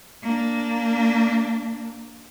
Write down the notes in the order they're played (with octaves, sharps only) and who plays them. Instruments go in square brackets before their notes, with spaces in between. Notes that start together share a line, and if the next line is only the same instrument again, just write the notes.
[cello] A#3 D4